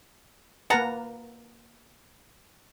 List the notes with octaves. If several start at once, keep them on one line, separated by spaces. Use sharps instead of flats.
A#3 A#4 B4 F#5 A5 A#5